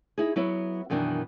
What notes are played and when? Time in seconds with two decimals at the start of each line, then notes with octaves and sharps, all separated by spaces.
0.18 D#4 E4 G#4
0.36 F#3 B3 E4 B4 C#5
0.90 F#2 B2 D#3 E3 D4